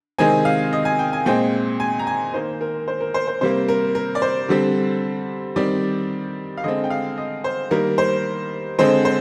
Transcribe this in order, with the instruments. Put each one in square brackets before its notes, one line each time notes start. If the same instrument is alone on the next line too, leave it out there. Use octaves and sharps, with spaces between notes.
[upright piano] C3 D#3 G#3 C4 G#5
F5
D#5
G#5
G5
G#5
A#2 G#3 C4 G5
G#5
A#5
G#5
D#3 A#3 C5
A#4
C5
A#4
C5
C5
C3 G3 A#3 C5
A#4
A#4
D5
C5
D3 G3 C4
D#3 G3 C4 D5
F5
D3 G#3 C4 D#5
G5
F5
D#5
C5
D#3 G3 A#3 A#4
C5
D3 G#3 C4 C5
C5